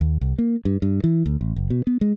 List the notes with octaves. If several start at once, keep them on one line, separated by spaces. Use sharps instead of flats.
D#2
C2
A#3
G2
G2
E3
D2
A1
F#1
B2
B3
G#3